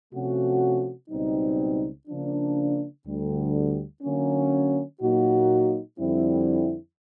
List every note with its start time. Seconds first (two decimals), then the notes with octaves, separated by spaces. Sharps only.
0.12 C3 F3 A3 C#4 F#4
1.10 C#2 B2 G3 C4 D#4
2.08 C#3 F3 A#3 D4
3.05 D2 D3 G3
4.02 D3 F#3 A#3 C#4
5.00 A#2 F#3 A#3 D#4 F#4
5.98 F2 D3 G3 C4 E4